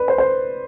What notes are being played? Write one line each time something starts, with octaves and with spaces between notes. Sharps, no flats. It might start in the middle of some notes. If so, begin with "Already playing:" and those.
Already playing: B4 D5
C5
C5